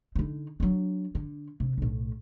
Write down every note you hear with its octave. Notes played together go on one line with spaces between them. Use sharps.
D3 D#4
F#3 D4
D3
C3
B1 A2